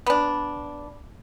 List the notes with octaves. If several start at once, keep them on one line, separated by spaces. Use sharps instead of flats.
B3 D4